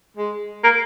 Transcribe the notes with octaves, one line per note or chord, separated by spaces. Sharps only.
G#3
A#3